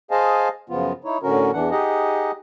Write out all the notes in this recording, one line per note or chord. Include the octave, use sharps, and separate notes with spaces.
G#4 C5 D#5 F5 G#5 A5
F#2 C#3 F3 B3 F4
D#4 E4 C#5
A2 D3 C#4 F#4 A#4
E2 E3 D4 F#5
D#4 G4 G#4 D#5 F#5